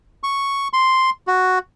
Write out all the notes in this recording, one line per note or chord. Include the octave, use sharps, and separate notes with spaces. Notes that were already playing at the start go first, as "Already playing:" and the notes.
C#6
C6
F#4